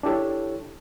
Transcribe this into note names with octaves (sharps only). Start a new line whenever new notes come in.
D4 E4 G4 A4 C#5